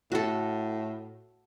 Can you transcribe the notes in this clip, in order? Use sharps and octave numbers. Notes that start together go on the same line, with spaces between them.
A2 F#4 A4